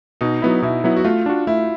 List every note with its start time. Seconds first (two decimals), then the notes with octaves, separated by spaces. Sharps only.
0.21 B2 D#4
0.42 F#3 B3 E4
0.62 B2 E4
0.84 F#3 B3 E4
0.96 F#4
1.04 A3 F4
1.26 D4 F#4
1.47 A3 E4